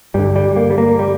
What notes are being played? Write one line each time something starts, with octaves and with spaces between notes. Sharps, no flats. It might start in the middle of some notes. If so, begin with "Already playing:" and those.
G2 D3 G3
G3
A#3
G3
A#3
G3